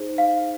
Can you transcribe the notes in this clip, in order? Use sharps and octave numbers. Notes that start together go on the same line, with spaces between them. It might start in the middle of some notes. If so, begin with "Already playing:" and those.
Already playing: D#4 G#4 C5
F5